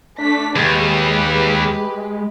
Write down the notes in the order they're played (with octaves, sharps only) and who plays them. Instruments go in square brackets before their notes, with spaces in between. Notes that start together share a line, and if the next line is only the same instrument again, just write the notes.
[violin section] A3 B6 [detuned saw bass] D4
[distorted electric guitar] D#2 [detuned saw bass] G#3 [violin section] G4 B4